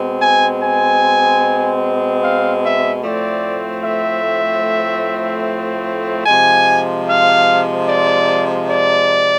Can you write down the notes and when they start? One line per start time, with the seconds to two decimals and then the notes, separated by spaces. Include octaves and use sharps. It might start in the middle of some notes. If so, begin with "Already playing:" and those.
Already playing: B2 G#3 C4
0.20 G#5
0.61 G#5
2.23 F5
2.63 E5
3.03 A2 F3 A3 C4 D5
3.83 E5
6.26 C3 F3 G#3 G#5
7.07 F5
7.88 D5
8.68 D5